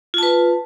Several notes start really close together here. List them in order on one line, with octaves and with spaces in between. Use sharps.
F4 A5 B4